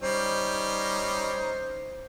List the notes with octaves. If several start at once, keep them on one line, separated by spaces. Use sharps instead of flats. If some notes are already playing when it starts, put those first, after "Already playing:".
G3 C#4 D#4 C5